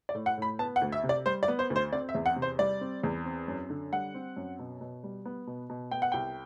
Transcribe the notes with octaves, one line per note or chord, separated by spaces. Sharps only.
D5
A2
F#5
A2 B5
B3 A5
F#5
D2
E5
C3
D5
G3 C5
D5
B3
C5
D2
C5
C4 D5
E5
E2
F#5
C3
C5
G3 D5
C4
E2
C4
F#2
D3
G3 F#5
C4
F#2
B2
B2
G3
B3
B2
B2
B3 G5
F#5
C2 G5